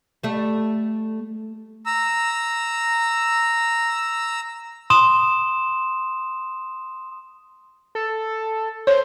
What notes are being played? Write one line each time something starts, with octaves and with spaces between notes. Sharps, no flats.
G3 A3
A#5 E6
C6 D#6 E7
A4
C5 C#5